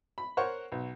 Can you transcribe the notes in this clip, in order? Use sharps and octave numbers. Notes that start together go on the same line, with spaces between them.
B5
A#4 C5 C#5 F#5 C#6
B1